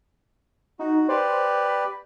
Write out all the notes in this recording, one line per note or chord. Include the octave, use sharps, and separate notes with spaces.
D#4 F#4
G4 B4 C5 D5
B5